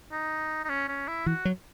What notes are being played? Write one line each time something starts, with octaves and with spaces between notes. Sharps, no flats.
D#4
D#4
C#4
C#4
E4
E3 F#4
F#3